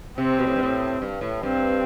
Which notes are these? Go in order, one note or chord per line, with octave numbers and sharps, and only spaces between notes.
C3 C4
B2
A2
G2
A2
G2
A2
G2 C4